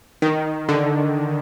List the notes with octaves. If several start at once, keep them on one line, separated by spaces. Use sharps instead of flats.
D#3
D3